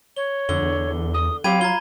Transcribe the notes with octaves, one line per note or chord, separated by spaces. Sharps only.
C#5 G7
F2 D3 G7
E2
D#6
F#3 C4 G4 F5 G5 B5 G#6 D#7
F4 A#5 G#6 G7